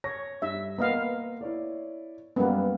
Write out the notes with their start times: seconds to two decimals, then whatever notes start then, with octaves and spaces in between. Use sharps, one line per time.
0.04 C#5 A#6
0.42 G2 E5
0.78 A#3 B3 A#4 D#5 F5
1.41 E4 C#5 D5
2.36 F#2 G3 A#3 B3